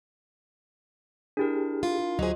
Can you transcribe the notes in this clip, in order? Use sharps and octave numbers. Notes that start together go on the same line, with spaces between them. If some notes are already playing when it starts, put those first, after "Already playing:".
D4 E4 G4 G#4 A#4
F4
D2 F#3 F4 G#4 C5 D#5